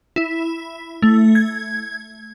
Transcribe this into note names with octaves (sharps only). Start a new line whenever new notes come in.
E4
A3
G#6